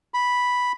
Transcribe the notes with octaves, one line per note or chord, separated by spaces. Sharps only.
B5